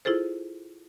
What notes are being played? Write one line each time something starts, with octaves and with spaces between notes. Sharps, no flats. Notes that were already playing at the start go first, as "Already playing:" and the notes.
E4 F4 G#4 A4 C5